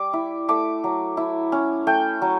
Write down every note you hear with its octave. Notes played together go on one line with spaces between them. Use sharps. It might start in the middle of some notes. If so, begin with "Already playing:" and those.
Already playing: G3 D6
E4
A3 D6
F#3
E4
C#4
A3 G5
F#3